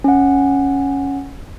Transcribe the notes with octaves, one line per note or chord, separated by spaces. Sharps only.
C#4 F#5